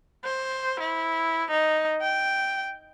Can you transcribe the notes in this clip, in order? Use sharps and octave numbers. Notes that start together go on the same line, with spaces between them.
C5
E4
D#4
G5